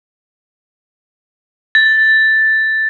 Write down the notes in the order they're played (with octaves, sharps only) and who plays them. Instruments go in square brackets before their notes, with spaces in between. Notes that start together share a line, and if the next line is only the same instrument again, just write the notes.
[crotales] A6